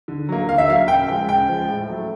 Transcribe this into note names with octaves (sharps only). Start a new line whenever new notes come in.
D3
F#3 A#3
D3 F5
E5
F#3 A#3 F5
C#3 G5
F3 G#3 G5
C#3 G5
F3 G#3
A2
F#3 A3